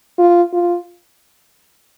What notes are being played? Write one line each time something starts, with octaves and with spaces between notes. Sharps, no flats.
F4
F4